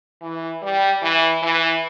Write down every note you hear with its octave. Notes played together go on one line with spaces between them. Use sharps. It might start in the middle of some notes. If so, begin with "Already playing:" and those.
E3
G3
E3
E3